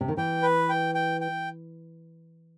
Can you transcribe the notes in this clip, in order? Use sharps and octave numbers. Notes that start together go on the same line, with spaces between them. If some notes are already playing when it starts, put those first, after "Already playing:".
C3
D#3
E3 G5
B4
G5
G5
G5